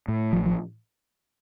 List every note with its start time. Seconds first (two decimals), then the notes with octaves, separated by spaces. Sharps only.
0.08 A2
0.33 A1 F3
0.46 F3